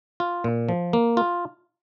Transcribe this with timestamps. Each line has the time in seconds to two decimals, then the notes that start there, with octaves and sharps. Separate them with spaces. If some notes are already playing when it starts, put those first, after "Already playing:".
0.20 F4
0.44 A#2
0.69 F3
0.93 A#3
1.17 F4